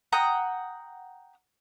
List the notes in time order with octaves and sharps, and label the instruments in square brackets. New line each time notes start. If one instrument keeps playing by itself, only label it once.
[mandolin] F#5 G5 A#5 D#6